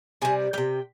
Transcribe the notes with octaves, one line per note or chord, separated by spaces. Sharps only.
C3 G3 G#5
C3 G3 G5